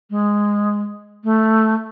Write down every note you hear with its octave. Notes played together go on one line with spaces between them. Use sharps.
G#3
A3